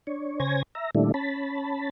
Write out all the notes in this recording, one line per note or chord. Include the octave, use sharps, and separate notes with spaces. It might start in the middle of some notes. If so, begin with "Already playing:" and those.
D4 C#5
C#3 C5 C#5 G#5 G#6 A#6
E5 A#5
A#2 D#3 G3 A3 D4 E4
C#4 A5 B5